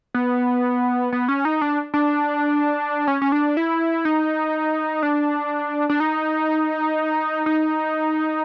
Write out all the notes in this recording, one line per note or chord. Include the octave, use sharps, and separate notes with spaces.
B3
B3
C#4
D#4
D4
D4
C#4
C#4
D4
E4
D#4
D4
D4
D#4
D#4